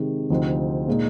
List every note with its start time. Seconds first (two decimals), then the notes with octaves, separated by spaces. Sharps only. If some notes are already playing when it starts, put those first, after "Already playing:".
Already playing: C3 D#3 G#3
0.30 D2 C3 F3 C4 D#4
0.88 A#2 G#3 D#4